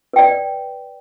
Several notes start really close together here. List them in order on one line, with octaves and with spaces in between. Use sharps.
B4 G5 D5